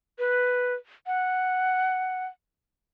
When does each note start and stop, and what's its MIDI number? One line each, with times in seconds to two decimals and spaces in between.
0.19 0.74 71
1.07 2.26 78